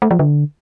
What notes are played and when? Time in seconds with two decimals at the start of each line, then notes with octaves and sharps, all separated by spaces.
0.02 A3
0.11 F3
0.19 D3